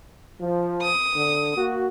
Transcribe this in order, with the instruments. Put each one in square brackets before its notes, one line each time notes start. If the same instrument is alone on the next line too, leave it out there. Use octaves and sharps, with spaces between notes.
[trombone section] F3
[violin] D#6
[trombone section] D3
A#3 F#4